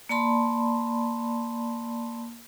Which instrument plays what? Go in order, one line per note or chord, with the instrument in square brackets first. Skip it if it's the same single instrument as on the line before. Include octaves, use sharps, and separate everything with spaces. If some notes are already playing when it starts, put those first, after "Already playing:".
[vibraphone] A#3 D5 A5 B5 C6